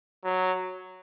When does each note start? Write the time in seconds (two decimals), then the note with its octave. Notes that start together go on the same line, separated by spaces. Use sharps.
0.24 F#3